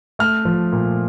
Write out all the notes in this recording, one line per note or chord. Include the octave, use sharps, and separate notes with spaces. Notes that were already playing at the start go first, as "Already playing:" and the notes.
A3 F6
F3
A#2